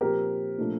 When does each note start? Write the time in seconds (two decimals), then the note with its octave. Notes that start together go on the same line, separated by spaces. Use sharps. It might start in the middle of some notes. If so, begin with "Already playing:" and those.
0.01 A#2 F3 C4 G4 A#4
0.58 A#2 F3 A3 D4